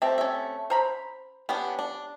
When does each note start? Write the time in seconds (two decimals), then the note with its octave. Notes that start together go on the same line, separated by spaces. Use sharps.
0.02 A3 C4 G4 E5
0.18 C#4 E5
0.70 C5 A#5 B5
1.49 B3 C#4 D4 G4
1.79 D4